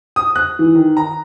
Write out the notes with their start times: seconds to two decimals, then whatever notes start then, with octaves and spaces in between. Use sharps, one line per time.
0.16 D#6
0.35 F#6
0.59 E3
0.75 D#3
0.97 A#5